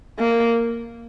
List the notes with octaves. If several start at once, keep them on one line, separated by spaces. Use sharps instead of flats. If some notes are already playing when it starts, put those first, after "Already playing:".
A#3